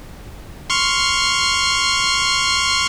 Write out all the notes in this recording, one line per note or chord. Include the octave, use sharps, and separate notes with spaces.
C6 C#6 F6